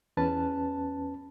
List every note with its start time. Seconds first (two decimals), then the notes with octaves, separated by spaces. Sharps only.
0.17 E2 C#4 B4 A5